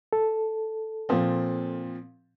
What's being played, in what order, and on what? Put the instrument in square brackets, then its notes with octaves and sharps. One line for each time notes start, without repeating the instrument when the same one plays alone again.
[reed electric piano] A4
[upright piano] A#2 F3 C4